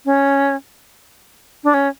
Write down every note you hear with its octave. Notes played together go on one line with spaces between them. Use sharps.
C#4
D4
C#4